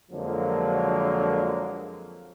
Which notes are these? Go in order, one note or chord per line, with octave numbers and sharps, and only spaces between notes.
F2 D3 F3 F#3 G#3 A#3